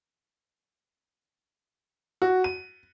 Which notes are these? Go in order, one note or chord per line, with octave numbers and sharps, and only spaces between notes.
F#4
D#7